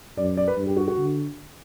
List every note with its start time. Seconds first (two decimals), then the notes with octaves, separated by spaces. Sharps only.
0.17 F#2 D5
0.37 D5
0.48 B4
0.57 G2
0.67 G4
0.77 F#4
0.88 F#4
0.97 D3